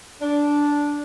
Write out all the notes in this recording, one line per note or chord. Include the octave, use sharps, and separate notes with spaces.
D4